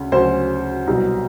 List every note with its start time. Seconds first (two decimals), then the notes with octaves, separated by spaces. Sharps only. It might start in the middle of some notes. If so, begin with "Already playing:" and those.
Already playing: D2 C#3
0.12 D2 C#3 F#3 C5
0.87 C2 B2 F#3